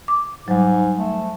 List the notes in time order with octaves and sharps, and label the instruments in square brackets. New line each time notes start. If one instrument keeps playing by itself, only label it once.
[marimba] D6
[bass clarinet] G#2 [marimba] F#3 G3
[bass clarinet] A3